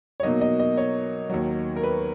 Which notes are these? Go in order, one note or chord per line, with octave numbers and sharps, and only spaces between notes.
C#5
B2 F#3 A#3 D#4 D#5
D#5
D#5
C#5
D#2 D#3 F#3
A#4
B4